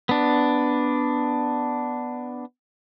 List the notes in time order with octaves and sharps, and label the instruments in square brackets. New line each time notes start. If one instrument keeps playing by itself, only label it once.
[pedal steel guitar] B3 D4